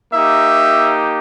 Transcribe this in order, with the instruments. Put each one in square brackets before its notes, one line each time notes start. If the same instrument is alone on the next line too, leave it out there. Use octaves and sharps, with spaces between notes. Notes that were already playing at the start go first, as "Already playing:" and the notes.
[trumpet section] A#3 D#4 G4 E5